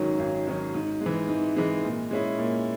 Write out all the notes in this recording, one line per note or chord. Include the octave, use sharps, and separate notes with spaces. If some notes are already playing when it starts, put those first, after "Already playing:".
Already playing: G#1 G#2 D#3 F#3 C#4
G#1
G#2 D#3 F#3 C#4
G#2
G#3
E3
G#2
E3 G#3
A#2
G#3 C#4 E4
A#2